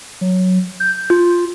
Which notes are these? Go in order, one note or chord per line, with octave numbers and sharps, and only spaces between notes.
F#3
G6
F4